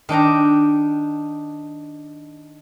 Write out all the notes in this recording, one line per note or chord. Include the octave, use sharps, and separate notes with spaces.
D#3 D4 G5 A#5